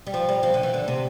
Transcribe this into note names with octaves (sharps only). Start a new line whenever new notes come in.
G3
F3
G3
F3
D3
E3
D3
C3